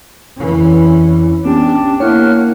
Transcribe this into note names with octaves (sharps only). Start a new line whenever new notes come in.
F2 E3 C#4 E4
B3 C#4 D4 G4 G5 A5
A#3 E4 C#5 F#5 F6 F#6